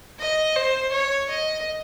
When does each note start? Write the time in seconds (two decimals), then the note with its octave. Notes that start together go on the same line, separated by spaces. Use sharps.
0.20 D#5
0.56 C5
0.92 C#5
1.30 D#5